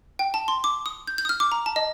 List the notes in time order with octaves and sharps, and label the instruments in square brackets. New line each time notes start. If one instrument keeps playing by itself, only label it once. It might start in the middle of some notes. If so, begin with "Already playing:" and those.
[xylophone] G5
A5
C6
D6
D#6
G6
G6
D#6
F6
D6
A#5
A5
D#5